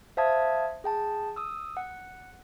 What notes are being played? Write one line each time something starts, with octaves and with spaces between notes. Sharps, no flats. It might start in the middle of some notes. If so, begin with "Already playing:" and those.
C5 E5 F5 A5 D#6 G#6
G#4 G5 A5
D#6 E6
F#5